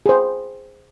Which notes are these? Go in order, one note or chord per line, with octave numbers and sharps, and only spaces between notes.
G#4 C5